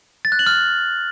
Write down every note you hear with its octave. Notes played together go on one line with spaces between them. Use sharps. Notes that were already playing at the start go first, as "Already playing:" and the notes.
A6
F#6
F#7
F6